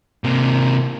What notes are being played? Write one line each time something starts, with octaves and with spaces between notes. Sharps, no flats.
C3 A#3